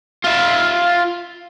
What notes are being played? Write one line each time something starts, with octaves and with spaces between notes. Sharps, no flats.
F4 E5